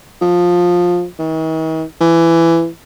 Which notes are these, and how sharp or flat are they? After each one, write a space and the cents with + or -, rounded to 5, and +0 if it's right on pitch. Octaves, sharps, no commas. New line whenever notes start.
F3 +15
D#3 +45
E3 +15